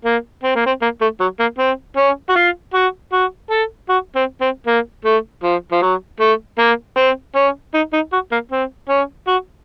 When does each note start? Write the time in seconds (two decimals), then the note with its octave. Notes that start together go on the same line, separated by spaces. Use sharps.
0.05 A#3
0.44 C4
0.55 A#3
0.66 C4
0.82 A#3
1.01 A3
1.20 F#3
1.40 A#3
1.59 C4
1.97 C#4
2.30 F#4
2.36 F4
2.74 F#4
3.13 F#4
3.51 A4
3.89 F#4
4.16 C4
4.41 C4
4.67 A#3
5.05 A3
5.44 F3
5.72 F3
5.82 F#3
6.20 A3
6.59 A#3
6.97 C4
7.36 C#4
7.74 D#4
7.93 D#4
8.13 F#4
8.32 A#3
8.52 C4
8.89 C#4
9.28 F#4